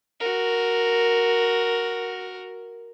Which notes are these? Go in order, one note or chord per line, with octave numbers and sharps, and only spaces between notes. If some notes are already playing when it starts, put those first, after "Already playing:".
F#4 A#4